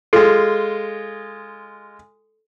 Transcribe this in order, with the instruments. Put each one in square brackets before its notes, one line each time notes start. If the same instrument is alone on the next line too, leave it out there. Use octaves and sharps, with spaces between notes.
[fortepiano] G#3 F4 [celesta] A4